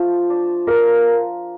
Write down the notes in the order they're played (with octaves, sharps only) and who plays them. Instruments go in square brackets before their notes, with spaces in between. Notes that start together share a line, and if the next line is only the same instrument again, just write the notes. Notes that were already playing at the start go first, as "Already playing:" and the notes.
Already playing: [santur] F3 A3 F4
D4
[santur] A#3 [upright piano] A#4